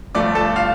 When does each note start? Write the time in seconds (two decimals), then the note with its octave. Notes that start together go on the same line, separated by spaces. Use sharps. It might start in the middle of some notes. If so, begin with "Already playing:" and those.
0.15 G1 G2 F3 A3 D5 D6
0.35 A4 A5
0.56 F4 F5